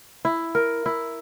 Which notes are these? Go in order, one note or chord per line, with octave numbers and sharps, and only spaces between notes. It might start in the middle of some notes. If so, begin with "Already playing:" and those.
E4
A#4
E4